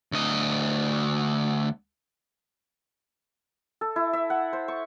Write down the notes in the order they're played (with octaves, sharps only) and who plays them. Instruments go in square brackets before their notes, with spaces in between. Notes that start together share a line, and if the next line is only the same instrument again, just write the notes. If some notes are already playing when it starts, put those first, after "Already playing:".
[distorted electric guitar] D2 D#5
[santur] A4
E4
E5
F#5
C5
C#6